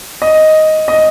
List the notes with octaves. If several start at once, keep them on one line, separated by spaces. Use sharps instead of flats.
D#5
D#5